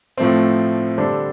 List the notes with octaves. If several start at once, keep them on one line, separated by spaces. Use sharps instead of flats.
A2 F3 A3 C4
D3 G3 D4 A4 C5